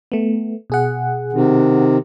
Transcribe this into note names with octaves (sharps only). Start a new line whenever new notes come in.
A3 B3
B2 G#4 F#5
C3 D#3